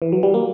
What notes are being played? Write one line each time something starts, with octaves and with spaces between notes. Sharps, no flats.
E3
F#3
G3
A#3